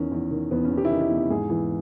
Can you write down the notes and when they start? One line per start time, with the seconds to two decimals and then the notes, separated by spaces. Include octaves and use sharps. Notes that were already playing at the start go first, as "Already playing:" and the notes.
Already playing: E2 D#3 C#4
0.12 E2
0.31 D#3
0.51 E2 B3
0.64 C#4
0.71 E2
0.77 G4
0.85 E4
0.91 D#3 D#4
1.01 E4
1.10 E2
1.30 G#2 G#4
1.50 E3